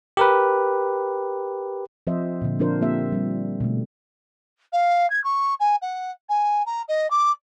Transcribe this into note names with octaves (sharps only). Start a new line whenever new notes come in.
G4 A#4 B4
F3 C4 C5 D#5 E5
A#2 D3
F3 C4 D4 F4 A#4 C5
A#3 C4 G4 E5
G3 C4
B2 D3 A3
F5
G#6
C#6
G#5
F#5
G#5
A#5
D#5
D6